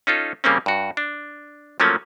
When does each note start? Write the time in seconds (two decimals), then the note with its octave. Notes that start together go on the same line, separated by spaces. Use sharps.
0.07 C#4 D#4 F4 A4
0.44 C#3 G3 A#3 C4 C#4
0.66 G2 F#4
0.97 D4
1.80 F3 F#3 A3 A#3 C#4